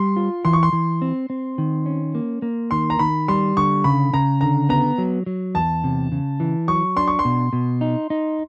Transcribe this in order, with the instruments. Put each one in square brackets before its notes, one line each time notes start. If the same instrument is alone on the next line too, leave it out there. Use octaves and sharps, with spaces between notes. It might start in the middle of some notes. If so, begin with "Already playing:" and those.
Already playing: [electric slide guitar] G3 [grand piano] C6
[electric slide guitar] F4
[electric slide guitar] E3 [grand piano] C6
[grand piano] C#6
C6
[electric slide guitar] E3
C4
C4
D#3
C#4
A#3
A#3
[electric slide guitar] D#3 [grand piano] C6
[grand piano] A#5
[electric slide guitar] D#3 [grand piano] B5
[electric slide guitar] G3 [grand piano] C6
[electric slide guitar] D3 [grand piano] C#6
[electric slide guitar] C#3 [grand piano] B5
[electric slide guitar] C#3 [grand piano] A#5
[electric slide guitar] D3 [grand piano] A#5
[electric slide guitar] B3 [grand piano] A#5
[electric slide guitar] F#3
F#3
[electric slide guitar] E2 [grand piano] A5
[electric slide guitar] C3
C#3
E3
[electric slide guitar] F#3 [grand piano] C#6
[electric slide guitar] D4 [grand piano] C6
[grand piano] C#6
C6
[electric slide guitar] B2
B2
D#4
D#4